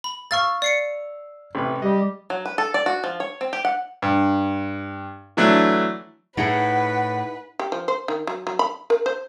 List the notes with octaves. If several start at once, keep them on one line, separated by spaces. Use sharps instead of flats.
B5
F5 C#6 E6 F6 A6
D5 C7 C#7
A1 C3 B4
G3 G4 D#5
F#3
B4
A4
D5
F#4
F3
C#5
C4
G4
F#5
G2
E3 F#3 A3 D4
A2 D#4 E4 G#4 B4 F#5
G4
F3
C5
D#3
F#3
F#3
B5
A#4
C5